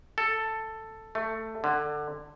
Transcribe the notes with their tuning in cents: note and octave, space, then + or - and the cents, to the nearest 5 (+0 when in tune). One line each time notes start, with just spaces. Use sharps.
A4 +5
A3 +10
D3 +20